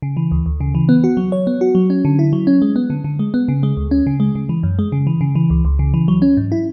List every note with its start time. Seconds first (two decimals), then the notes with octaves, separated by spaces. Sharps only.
0.02 C#3
0.17 E3
0.31 D2
0.46 D2
0.60 C#3
0.75 E3
0.89 B3
1.04 F#4
1.17 F#3
1.32 C#5
1.47 B3
1.61 F#4
1.75 F#3
1.90 C#4
2.05 D3
2.19 E4
2.33 F#3
2.47 C#4
2.62 G#3
2.76 B3
2.90 D3
3.04 D3
3.19 G#3
3.34 B3
3.48 C#3
3.63 G#3
3.77 D2
3.91 C#4
4.07 C#3
4.20 G#3
4.35 C#3
4.49 E3
4.63 F#2
4.79 G#3
4.92 C#3
5.07 E3
5.21 C#3
5.35 E3
5.50 C#2
5.65 C#2
5.79 C#3
5.94 E3
6.08 F#3
6.22 C#4
6.37 G#2
6.52 E4